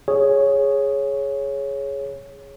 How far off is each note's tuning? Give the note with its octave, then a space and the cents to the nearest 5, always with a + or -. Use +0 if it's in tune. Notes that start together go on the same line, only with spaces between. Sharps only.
G#4 +0 C#5 +0